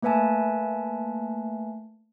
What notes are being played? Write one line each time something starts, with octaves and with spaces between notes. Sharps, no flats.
A3 A#3 B4 E5 G#5 A5